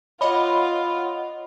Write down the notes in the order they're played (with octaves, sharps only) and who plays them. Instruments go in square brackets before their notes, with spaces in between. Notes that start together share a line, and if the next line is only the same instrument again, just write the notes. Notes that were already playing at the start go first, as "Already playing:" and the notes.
[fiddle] F4 [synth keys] C#5 D#5 F#5 [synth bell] B5